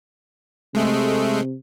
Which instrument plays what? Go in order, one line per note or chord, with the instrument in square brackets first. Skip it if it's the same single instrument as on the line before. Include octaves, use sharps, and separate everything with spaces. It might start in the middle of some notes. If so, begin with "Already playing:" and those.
[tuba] C3 [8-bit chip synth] G#3 A3